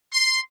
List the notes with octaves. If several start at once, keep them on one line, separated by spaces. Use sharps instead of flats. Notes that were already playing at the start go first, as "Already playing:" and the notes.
C6